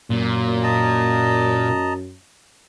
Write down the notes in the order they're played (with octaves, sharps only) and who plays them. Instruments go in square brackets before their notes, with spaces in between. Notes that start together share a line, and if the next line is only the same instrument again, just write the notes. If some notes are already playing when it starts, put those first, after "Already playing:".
[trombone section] F#2 [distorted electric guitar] A#2
[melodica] D#5 A5 A#5